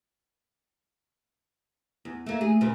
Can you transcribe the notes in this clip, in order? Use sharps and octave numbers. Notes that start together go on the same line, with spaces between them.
E2
A3 A#3
G#4
A#2 C#3 C4